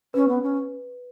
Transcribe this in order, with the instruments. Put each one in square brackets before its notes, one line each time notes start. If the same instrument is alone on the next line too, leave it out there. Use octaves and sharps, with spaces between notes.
[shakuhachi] C#4 [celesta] B4
[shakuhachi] B3
C#4